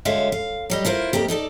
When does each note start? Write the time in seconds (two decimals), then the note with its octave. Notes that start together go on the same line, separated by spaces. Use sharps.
0.05 D3 G#3 F#4 C#5 E5 F5
0.32 F5
0.70 F#3 G3 D#5
0.85 E4 F4 A#4 C5
1.13 F2 A3 A#3 G4
1.28 D#4 E4 A4 D5